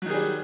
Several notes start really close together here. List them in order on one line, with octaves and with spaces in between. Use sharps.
F#3 D#3 G#4 G3